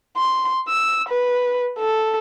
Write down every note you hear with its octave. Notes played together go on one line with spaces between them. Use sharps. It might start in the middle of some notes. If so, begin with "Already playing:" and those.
C6
E6
B4
A4